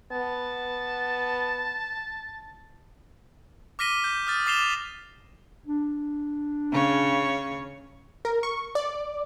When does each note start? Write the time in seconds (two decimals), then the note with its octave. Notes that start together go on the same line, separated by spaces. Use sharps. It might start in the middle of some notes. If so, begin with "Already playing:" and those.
0.12 B3 A5
3.79 D6 F6 A#6 B6 D#7 G7
4.04 G6
4.27 D#6 F6 A6
4.47 D6 A6 C7 E7 F7 G7
5.66 D4
6.72 C#3 C#5
8.25 A#4
8.43 C#6
8.75 D5